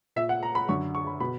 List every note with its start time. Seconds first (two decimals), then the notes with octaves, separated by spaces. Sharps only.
0.16 A#2 E5
0.29 F#5
0.43 A#5
0.55 B5
0.69 F#2 D3 C#6
0.95 C#6
1.07 B5
1.20 B2 B5